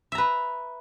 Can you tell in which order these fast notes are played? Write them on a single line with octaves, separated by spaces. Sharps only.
E5 A#5 B4